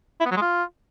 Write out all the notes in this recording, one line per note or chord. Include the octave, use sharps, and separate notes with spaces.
E4
B3
F#3
G#3
F4